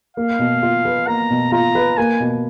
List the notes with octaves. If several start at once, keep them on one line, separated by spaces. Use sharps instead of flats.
A#3 F5
B2
F4
B4
A#3 A#5
B2
F4 A#5
B4
A#3 G#5
B2